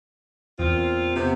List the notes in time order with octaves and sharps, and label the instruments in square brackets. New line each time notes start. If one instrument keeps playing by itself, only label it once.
[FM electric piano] E2 [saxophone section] A#2 C4 F4
[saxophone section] C3 B3